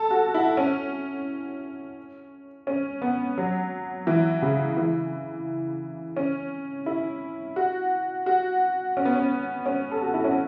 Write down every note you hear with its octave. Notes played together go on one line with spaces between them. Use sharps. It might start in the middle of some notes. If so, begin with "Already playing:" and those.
Already playing: A4
F#4
E4
C#4
C#4
B3
F#3
E3
C#3
E3
C#4
E4
F#4
F#4
C#4
B3
C#4
C#4
A4
F#4
E4
C#4